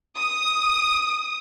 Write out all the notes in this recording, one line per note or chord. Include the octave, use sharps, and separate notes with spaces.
D#6